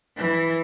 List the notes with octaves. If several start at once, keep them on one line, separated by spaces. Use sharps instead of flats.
E3